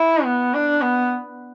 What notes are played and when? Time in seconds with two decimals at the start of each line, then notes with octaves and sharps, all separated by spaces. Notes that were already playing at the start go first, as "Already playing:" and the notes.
Already playing: E4
0.25 B3
0.54 D4
0.82 B3